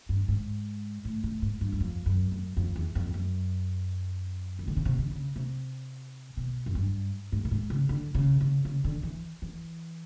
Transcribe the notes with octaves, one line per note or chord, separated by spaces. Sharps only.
G2
G#2
A2
A2
G#2
G2
E2
F2
F#2
F#2
F2
E2
F2
F#2
D#3
D3
C#3
C3
D3
C#3
C3
B2
F#2
G2
G#2
A2
G#2
C#3
D3
C#3
C#3
C#3
D3
E3
E3